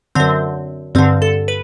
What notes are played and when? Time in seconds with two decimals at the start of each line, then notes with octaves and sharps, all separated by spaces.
0.15 F#2 D3 C4
0.95 G2 D3 C4
1.22 A4
1.48 B4